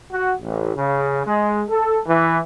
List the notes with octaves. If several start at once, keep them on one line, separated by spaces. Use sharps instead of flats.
F#4
A1
C#3
G#3
A4
E3